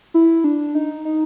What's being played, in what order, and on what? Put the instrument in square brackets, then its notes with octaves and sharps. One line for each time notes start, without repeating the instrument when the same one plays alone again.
[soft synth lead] E4
D4
D#4
D#4